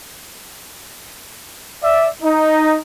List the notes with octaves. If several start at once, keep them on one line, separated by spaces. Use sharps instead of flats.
D5 E5
D#4